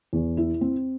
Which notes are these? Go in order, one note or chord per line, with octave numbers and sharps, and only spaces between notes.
E2
E4
C4